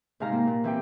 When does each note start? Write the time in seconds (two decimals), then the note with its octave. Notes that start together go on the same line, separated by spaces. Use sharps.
0.20 G#2 C3 F5 A#5 F6
0.32 A#3
0.47 A#2
0.64 E3 C4 G4 G5